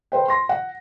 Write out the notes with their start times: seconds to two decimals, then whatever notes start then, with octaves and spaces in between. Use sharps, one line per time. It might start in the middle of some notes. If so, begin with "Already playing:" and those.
0.12 A4 B4 C5 G5
0.28 C6 A#6
0.49 F#5